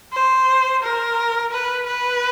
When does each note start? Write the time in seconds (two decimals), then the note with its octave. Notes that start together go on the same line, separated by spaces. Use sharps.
0.13 C5
0.83 A#4
1.52 B4
1.86 B4